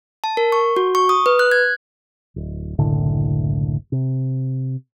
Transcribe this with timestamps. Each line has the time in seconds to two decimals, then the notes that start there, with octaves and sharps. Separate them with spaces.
0.24 A5
0.37 A#4
0.52 C#6
0.76 F#4
0.95 C#6
1.09 D#6
1.26 B4
1.39 F#6
1.51 G#6
2.36 D1
2.78 F#1 C2 A2 D3
3.92 C3